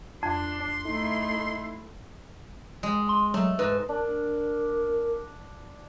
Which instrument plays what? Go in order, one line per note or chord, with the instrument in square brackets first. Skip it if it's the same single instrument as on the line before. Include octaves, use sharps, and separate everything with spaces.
[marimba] F2 [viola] D4 [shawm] C6
[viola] A3 E4 [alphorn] D#4
[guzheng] G#3
[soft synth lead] C6
[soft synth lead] F#3 [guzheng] A3
[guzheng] G#2 [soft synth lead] B4
[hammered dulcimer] D4 [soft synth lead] A#4